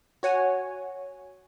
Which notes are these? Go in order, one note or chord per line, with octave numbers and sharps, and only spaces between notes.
F#4 C#5 F#5 G#5